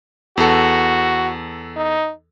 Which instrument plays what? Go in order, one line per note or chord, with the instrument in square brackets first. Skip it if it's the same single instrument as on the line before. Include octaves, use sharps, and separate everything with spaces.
[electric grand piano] E2 A4 [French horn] F#4
[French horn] D#4